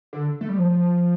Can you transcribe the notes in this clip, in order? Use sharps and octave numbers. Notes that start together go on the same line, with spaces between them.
D3
A3
G3
F3